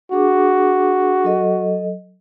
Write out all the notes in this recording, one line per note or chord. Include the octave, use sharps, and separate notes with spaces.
D4 F#4 G#4 D6
F#3 A4 D#5